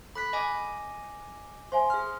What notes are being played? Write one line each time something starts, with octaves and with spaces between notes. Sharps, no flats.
A4 B5 F#6 B6
D#5 G#5 D6
C5 E5 G#5 C6
G#4 F6